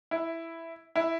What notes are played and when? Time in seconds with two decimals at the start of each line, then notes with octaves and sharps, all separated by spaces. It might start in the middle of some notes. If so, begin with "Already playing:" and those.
0.11 E4
0.96 E4